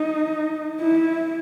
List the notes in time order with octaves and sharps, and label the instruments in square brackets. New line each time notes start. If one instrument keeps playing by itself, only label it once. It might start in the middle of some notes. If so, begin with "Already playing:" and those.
Already playing: [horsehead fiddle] D#4
E4